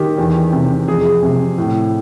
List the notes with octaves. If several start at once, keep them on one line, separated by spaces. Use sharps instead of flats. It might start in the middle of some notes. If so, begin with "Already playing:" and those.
Already playing: D#3 G4
E2
C3
F2 G#4
C3
A2